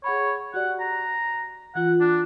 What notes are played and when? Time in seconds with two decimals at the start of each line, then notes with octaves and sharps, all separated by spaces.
0.04 G#4 C#5 F#5 B5
0.54 F#4 G4 D5 F#5
0.80 A#5
1.75 E3 F4 F#5
2.00 D4